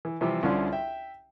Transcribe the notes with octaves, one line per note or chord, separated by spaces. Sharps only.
E3
C3 E3 F3 G3 C4
C2 D3 C#4 D4 F4 C6
E5 G5